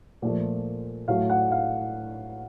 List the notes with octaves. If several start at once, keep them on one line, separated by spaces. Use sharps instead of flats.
A#2 F3 A3
A2 F#3 A3 F5
F#5
F5